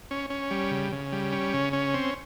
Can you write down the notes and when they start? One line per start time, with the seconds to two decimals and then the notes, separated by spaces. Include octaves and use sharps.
0.11 C#4
0.30 C#4
0.51 G3
0.71 C#3
0.92 C#3
1.12 G3
1.33 C#4
1.54 C#3
1.73 C#4
1.94 C4